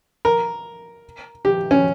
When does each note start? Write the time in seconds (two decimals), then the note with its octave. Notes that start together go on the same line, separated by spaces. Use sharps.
0.25 A#4
1.45 G4
1.71 C#4